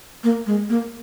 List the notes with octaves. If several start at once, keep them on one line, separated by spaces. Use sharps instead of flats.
A#3
G#3
A#3